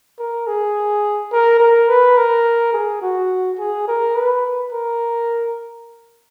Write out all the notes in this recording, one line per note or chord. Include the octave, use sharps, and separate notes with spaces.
A#4
G#4
A#4
A#4
B4
A#4
G#4
F#4
G#4
A#4
B4
A#4